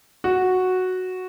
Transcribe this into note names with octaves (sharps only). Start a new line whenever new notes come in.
F#4